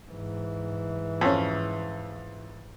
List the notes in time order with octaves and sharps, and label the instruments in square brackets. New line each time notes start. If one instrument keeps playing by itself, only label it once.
[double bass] G#2 E3
[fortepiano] F2 C#4